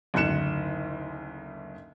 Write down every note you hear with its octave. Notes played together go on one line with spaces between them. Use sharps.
F#1 D2 G#2 F#6 C#7 E7